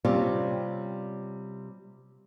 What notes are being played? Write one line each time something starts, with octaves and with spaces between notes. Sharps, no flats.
C3 G3 C4 C#4 F4